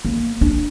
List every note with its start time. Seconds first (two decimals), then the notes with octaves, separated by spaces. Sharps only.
0.05 A#3
0.41 D4